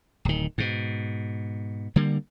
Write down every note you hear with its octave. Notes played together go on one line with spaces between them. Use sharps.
D1 D#3
G#2 B2
D3 G3 A#3